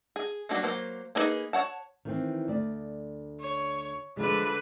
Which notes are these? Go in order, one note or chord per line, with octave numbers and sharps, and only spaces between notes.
G#4
F#3 G3 A#3 D4 F#4
F#3 A#3 C5
A#3 D4 D#4 G#4 B4
C#5 F#5 A5
D#3 E3 C4
D2 D5
C#5
D3 F3 F#3 G#3 B4